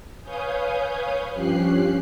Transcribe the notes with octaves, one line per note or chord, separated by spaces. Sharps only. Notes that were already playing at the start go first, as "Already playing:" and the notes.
B4 C#5 F5 G#5 D#6 G6
G2 F3 C#4 G4 F#6 C7